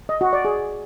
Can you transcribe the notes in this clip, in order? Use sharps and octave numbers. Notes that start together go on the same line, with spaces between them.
D#5
F#4
D5
G#4